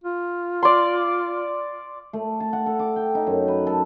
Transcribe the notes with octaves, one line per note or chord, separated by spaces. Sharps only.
F4
D5 C6
A3
A5
F#5
A4
D6
G5
D#4
F#2
B4
A4